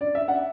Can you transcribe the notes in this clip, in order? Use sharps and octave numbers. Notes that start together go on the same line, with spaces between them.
D5
E5
F#5